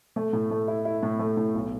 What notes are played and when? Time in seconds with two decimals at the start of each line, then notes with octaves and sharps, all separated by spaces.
0.16 A3
0.33 A2
0.51 A3
0.68 E4
0.85 E4
1.03 A2
1.19 A3
1.37 A2
1.54 B1